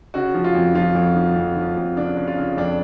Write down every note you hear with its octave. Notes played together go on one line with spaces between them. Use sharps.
C#3 F#4
F3
F4
F2
F3 F4
F2
F3
F2
F3
F2
C#3 D4
C#3
F4
C#3
F2 D4